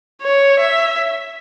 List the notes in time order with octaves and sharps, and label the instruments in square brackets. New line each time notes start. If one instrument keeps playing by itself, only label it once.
[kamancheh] C#5
E5